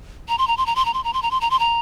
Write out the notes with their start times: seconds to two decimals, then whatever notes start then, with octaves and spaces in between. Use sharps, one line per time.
0.29 A#5
0.38 C6
0.47 A#5
0.57 C6
0.66 A#5
0.76 C6
0.85 A#5
0.94 C6
1.04 A#5
1.13 C6
1.22 A#5
1.31 C6
1.41 A#5
1.50 C6
1.59 A#5